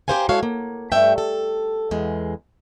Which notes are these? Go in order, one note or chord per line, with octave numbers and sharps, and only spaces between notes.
G4 A4 A#4 C5 F5 G#5
G#3 E4 F#4 A4 C#5 F5
A#3
G2 A3 E5 G5
A4
E2 G#3